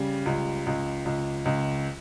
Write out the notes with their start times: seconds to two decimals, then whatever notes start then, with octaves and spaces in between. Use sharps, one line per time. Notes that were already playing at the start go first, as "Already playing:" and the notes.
Already playing: C#3 G3
0.26 C#2
0.66 C#2
1.05 C#2
1.45 C#2